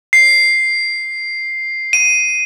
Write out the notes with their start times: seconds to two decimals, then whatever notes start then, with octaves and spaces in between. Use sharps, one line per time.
0.13 C7
1.93 D#7